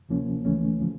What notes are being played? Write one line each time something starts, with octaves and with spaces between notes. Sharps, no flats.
D2 C3 F3 A#3 C#4
D2 C#3 E3 A3 C#4
C#3 F3